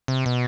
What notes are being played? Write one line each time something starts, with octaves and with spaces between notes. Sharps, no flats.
C3
B2